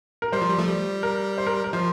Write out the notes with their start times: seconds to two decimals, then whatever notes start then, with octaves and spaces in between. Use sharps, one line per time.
0.22 A#4
0.32 G3 C5
0.42 F3
0.49 G3
0.59 F3 A3
0.68 G3
1.03 A#4
1.38 C5
1.47 A#4
1.64 A#4
1.73 F3 C5